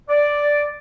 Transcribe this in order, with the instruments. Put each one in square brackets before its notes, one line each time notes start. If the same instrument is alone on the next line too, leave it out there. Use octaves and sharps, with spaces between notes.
[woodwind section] D5